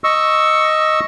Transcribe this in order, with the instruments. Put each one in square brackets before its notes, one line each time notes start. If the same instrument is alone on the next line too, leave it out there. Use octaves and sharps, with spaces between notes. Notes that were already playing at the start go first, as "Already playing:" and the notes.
[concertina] D#5 C#6 E6